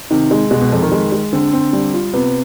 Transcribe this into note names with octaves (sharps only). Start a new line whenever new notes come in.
C3 D#3
G#3
B2 G#3
B2
F2 C3
D#3
G#3
G#3
D3 C4
C4
G3
F4
C3 B3